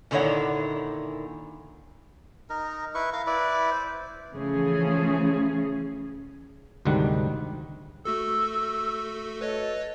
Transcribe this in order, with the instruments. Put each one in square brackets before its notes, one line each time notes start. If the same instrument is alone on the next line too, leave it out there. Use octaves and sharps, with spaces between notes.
[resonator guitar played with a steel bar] A#2 D3 D#3 E4 C#5 F#5
[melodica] D#4 A#4
E4 B4 C#6
A#4 F5
E4 B4 D5
C5
[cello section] C#3 E3 F3 A3 C#4 G#4
[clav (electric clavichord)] D2 G#2 C3 D#3 G3 F#5
[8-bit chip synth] A3 F#4 A4 [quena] E6
[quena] A4 [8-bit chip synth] B4 C#5 D#5